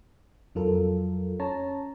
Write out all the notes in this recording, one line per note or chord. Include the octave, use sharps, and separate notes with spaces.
F2 F#3 F4 A4 A#4
C#4 C#5 A5 A#5